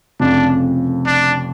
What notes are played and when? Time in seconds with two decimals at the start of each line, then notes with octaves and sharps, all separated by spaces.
0.20 F1 F2 C#3 D4
1.06 D4